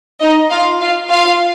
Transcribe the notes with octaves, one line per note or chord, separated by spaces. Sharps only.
D#4 D#5
F4 F5
F4 F5
F4 F5